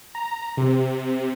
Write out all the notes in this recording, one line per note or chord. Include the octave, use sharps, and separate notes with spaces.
A#5
C3